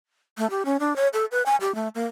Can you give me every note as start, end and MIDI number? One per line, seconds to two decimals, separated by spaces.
0.38 0.47 57
0.50 0.63 67
0.65 0.77 61
0.80 0.96 62
0.96 1.08 73
1.13 1.25 69
1.31 1.43 71
1.46 1.56 80
1.61 1.75 67
1.75 1.88 57
1.95 2.06 58